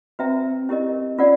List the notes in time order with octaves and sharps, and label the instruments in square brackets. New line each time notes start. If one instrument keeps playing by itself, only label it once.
[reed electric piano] C4 [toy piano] F#4 B4 E5 G5 A#5
[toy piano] C#4 E4 G4 A#4 D#5
[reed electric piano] C#4 [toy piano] F4 A#4 D5 F#5